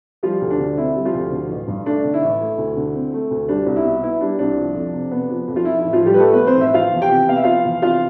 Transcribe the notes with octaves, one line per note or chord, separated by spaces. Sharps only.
F3 G3 F4
D2
D4
D3
C4 E4
G3
F3 F4
D2
D3
A1
G2
A3 D4
D3
E4
A1
A3
D2
D3
C4
A3
D2
G3 D4
C2
E4
B2
B3 E4
G3 D4
C2 D4
F3
F2
C3
B3
F3
F2
F4
F3 E4
E4
A1
F3 F4
A2 G3 G4
B4
A3 A4
F3 B3 B4
C4 C5
A1 E4 E5
F3 F4 F5
E2
G4 G5
C3
B3 F5
E5
F3 F4 F5
E2
C3 F4 F5